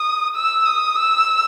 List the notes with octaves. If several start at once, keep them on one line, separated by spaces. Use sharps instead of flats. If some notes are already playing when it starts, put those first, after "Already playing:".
Already playing: D#6
E6
D#6
E6